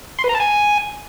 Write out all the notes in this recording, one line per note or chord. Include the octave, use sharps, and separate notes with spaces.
C6
B4
A#5
A5
G#5